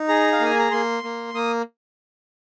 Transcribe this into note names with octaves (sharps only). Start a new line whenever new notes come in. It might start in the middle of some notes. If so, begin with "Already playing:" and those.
Already playing: D#4
G#4 A#5
F5
A#3 G#5
A#5
A#3 C6
A#3
A#3 D#6